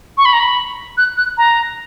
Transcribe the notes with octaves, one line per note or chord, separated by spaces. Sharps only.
C#6
B5
A#5
B5
F#6
F#6
A#5